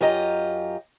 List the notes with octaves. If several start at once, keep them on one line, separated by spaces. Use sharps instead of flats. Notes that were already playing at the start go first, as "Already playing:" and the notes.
F#2 F4 G4 D#5 A#5